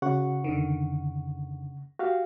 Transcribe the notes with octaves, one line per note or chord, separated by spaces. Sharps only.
C#3 F#4 F#5 C#6
F2 D3 D#3
F#4 G4 F5